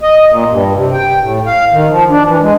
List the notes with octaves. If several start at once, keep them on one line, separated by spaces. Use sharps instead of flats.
D#5
A#2
G2
C3
G5
A2
F5
D#3
F3
D4
E3
G#3